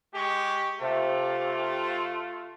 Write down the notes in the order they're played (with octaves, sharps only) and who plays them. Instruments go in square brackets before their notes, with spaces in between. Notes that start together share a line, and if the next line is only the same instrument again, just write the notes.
[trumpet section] G#3 G4 C#6
[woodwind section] C3 [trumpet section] A3 F4